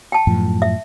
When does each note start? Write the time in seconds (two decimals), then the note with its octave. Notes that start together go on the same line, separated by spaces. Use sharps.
0.12 G5 A5
0.27 F#2 A2 F3
0.62 E5